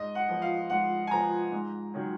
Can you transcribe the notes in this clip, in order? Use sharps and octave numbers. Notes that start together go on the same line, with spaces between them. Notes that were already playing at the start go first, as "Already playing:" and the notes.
Already playing: G#2 D#5
F#5
F3 B3
F5
G#2 F#5
G#5
F3 B3 A#5
G#2
D#3 F#3 C#4